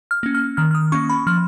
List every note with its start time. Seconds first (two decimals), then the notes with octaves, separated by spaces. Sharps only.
0.11 F6
0.23 A#3 C#4
0.35 F6
0.57 D#3 F6
0.71 F6
0.75 D#6
0.92 A#3 C#4 C#6
1.10 B5
1.27 F3 F6